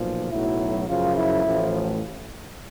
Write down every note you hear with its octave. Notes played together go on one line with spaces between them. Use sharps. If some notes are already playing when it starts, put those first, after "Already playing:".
Already playing: B1 A#2 F3
B1 A2 F#3 E4
F#2 C#3 F3 F4
E4
A1 A2 F3